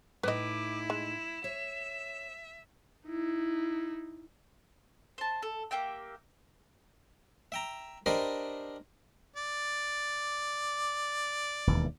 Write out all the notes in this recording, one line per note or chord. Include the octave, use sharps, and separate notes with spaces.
A2 D#4 E4 B4 D#5 D6
G#3 E7
C#5 E5
D#4 E4
C5 A5
A4
A#3 G4 E5 G5
E5 G5 A#5
D4 G4 A#4 C5 D#5 B5
D5
E1 D#2 E3